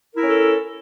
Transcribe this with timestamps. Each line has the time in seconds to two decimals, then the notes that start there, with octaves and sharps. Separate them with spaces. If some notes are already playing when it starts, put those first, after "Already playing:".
0.13 A#4
0.17 E4
0.22 C#4
0.27 A4